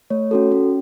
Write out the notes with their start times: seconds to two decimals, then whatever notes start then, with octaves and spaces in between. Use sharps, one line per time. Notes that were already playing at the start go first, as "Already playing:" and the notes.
0.10 A3 C#5
0.31 C#4 F#4 A4
0.52 C#4